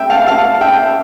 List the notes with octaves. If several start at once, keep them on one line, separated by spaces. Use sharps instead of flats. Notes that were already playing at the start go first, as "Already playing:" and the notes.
Already playing: E5 G5
F5 A5
F5 A5
E5 G5